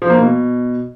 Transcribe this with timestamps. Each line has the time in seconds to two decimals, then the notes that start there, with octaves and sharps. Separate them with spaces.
0.02 F3
0.10 A#3
0.18 B2